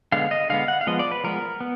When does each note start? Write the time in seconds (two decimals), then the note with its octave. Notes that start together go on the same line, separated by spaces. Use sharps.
0.12 D3 G#3 B3 F5
0.31 D#5
0.50 D3 G#3 B3 F5
0.68 F#5
0.81 F5
0.87 F3 G#3 B3 D#5
0.99 D5
1.11 B4
1.24 F3 G#3 B3 A#4
1.60 B3